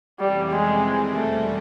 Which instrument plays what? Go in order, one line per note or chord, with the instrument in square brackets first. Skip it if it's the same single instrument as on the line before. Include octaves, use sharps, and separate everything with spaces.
[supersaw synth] F2 C3 E3 A3 C#4 [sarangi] G3
[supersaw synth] F2 C3 E3 G3 C4 [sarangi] G#3
[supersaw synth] D#3 G3 C4
[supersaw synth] E2 B2 G3 [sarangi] A3